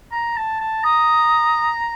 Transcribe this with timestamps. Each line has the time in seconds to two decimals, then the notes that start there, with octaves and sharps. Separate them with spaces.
0.12 A#5
0.37 A5
0.61 A5
0.84 A#5 D#6